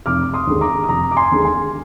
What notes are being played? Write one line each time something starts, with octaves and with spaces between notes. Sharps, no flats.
F1 D6 F6
C6 D#6
D#2 D3 G#3
A#5 D6
D#6
F1 A#5 D6
D6
G#5 C6
D#2 D3 G#3
G#5 C6